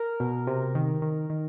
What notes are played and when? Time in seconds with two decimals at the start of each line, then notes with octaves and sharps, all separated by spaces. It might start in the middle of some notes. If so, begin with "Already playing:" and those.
Already playing: A#4
0.20 B2
0.47 C3
0.75 D#3
1.02 D#3
1.30 D#3